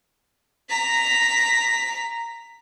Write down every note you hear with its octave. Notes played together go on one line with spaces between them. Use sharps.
A#5 B6